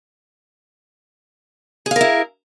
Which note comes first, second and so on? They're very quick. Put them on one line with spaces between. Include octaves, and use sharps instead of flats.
G#4 F5 A#4 E4